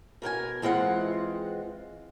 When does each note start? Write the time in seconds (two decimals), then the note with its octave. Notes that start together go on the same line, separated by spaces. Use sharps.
0.22 B2 A#4 C5 G#5
0.62 E3 G#3 C4 F4 F#5